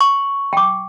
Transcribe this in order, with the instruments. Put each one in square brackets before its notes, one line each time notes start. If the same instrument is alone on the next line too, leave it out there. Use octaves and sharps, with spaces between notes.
[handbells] C#6
[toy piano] G5 D6